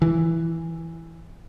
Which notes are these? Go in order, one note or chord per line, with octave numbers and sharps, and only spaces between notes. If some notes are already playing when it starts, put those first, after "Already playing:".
E3